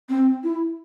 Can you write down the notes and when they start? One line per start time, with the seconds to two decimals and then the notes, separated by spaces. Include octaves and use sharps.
0.09 C4
0.44 E4